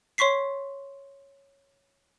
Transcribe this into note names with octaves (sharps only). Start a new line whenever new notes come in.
C#5 C6 C#6 B6 C7